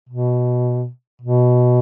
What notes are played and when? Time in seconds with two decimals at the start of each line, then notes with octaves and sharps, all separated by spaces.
0.09 B2
1.22 B2